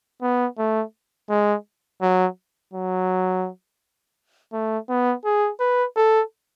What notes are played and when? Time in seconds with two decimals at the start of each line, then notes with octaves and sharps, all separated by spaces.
0.22 B3
0.58 A3
1.30 G#3
2.01 F#3
2.73 F#3
4.53 A3
4.89 B3
5.25 G#4
5.60 B4
5.96 A4